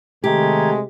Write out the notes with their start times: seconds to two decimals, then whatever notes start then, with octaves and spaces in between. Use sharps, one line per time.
0.24 C3 D#3 G#3 A3 G4 A#5 G#6